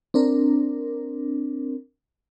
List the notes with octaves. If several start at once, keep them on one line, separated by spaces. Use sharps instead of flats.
C4 D4 A#4